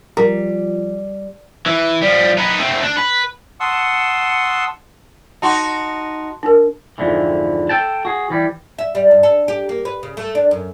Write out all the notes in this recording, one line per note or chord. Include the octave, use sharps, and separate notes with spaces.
F3 G3 A#4
E3
F3 G3
D#4 B4
A3 C4
D4
B4
F#5 A5 C6 C#6 D#6 E6
D#4 F#4 A5 C6
D4 A#4
F2 G#2 D3 E3
A4 G5 A5
F#4 G#4
E3 G3
E5
G3
G2
A4
G4
A#3
B4
C#3
A3
D4
F#2